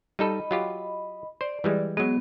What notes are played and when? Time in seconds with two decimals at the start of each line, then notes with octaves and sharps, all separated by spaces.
0.19 G3 D#4 A4 D#5 B5
0.51 F#3 F4 G4
1.41 C5 D5
1.64 E3 G3 G#3
1.97 F#3 G#3 B3